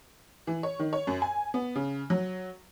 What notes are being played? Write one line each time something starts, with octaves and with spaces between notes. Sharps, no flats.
E3
C#5
D#3
C#5
F#2
G#5
B3
C#3
F#3